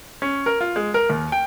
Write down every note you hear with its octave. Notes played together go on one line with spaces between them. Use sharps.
C#4
A#4
F4
G#3
A#4
D#2
G5